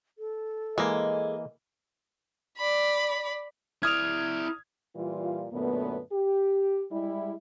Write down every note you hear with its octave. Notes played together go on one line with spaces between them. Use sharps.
A4
E3 G#3 A#3 D#5
D5 B5
E4 D5 D#6 F6 G#6 F7
A#2 E3 G3 F4
F#2 A#2 D3 A3 B3
G4
G3 G#3 E4